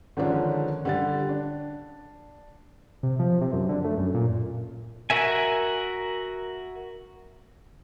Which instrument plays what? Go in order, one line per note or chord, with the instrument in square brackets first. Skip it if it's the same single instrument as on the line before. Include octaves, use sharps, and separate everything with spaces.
[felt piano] D3 D#3 F3 G#3 C#4 D4
D3 G3 A6
D4
[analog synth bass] C3
F3
C3
F#2
D3
A3
F#2
A#2
[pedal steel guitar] F#4 A#4 E5 G#5